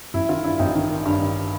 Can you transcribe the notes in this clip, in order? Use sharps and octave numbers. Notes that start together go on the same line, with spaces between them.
A1 E4
D#3 F4
G2 E4
A1 D#4
D#3
D#3
G2
D#3